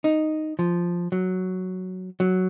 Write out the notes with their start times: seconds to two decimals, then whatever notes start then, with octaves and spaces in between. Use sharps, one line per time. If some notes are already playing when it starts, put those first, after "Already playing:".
0.04 D#4
0.59 F3
1.12 F#3
2.20 F#3